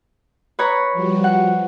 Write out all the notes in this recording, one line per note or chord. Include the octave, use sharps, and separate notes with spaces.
B4 C#5 A#5
F3 G3 F#4
F3 F#5